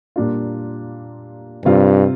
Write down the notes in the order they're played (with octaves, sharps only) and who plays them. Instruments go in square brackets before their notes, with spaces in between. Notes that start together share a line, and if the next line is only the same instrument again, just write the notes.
[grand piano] A#2 G3 A#3 D4 F4
[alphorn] G2 [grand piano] C3 G3 C4 F4